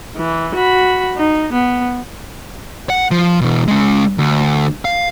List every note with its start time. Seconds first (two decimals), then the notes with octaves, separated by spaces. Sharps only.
0.17 E3
0.55 F#4 B5
1.17 D#4
1.53 B3
2.90 F#5
3.11 F3
3.41 B2 E3
3.68 G#3 C#4
4.18 D2
4.85 F5